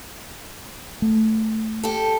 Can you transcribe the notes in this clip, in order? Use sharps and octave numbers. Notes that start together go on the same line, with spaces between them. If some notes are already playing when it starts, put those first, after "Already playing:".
A3
G4 A4